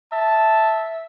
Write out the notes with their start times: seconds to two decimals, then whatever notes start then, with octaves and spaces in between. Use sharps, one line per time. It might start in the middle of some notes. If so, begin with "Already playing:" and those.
0.12 E5 A5